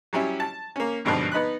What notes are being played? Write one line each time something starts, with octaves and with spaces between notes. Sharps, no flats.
F#3 G3 C#4 E4
A5
A#3 C#4
G#1 G2 B2 D3 F3
B3 D#4 B5 F#6